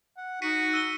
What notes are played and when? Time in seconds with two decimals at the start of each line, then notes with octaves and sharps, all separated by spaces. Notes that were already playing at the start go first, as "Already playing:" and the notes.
0.17 F#5
0.42 D#4 F#4 B6 C#7 D#7
0.73 E6 D#7 G7